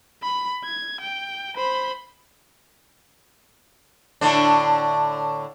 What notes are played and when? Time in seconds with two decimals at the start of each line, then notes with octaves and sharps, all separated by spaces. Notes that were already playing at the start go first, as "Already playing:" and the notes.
0.22 B5
0.64 G#6
1.01 G5
1.56 C5 B5
4.21 A2 D3 D4